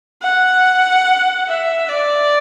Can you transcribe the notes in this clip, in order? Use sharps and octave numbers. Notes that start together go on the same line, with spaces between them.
F#5
E5
D5